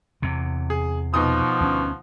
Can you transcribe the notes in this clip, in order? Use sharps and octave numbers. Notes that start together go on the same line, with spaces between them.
E2 C3
G#4
B2 F3 D#4 D#6
D2 C#4